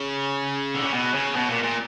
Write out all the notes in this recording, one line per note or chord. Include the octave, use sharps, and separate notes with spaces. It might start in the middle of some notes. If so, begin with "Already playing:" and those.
Already playing: C#3
D3
C#3
B2
C#3
B2
A#2
A#2